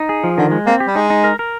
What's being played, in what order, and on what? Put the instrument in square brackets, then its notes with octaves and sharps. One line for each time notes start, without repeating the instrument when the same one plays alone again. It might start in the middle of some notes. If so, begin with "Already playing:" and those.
Already playing: [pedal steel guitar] D#4
G#4
F3
[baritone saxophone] D3 [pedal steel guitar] D#3
[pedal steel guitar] G#3
[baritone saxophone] A#3 [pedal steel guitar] C4
[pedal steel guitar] G4
[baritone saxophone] G3
[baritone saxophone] G#3 [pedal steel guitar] D#4
[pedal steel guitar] D#4
A#4
A#4